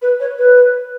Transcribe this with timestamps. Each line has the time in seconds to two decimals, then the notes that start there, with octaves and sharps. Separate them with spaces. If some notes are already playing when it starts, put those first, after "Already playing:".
0.02 B4
0.20 C#5
0.38 B4